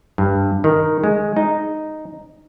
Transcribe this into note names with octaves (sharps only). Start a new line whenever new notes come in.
G2
D#3
G#3
D#4